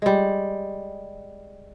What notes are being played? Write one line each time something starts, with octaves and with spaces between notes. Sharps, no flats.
G3 G#3